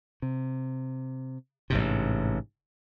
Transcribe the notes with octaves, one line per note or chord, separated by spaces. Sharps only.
C3
A1 G#2 C3